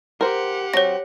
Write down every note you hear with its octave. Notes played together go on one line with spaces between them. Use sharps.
G4 A#4 C5 F#5
F#3 C4 C#5 A#6